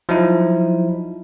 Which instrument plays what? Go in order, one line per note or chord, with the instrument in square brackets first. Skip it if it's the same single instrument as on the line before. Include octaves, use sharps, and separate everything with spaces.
[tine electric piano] F3 F#3 D#4 E4